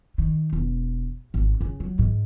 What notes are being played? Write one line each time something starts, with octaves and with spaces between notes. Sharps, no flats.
D#3
E1
G#1
C#3
F#3
G#2